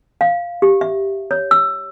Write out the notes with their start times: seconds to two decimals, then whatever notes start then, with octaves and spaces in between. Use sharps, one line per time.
0.21 F5
0.62 G4
0.81 E5
1.31 C#5
1.51 E6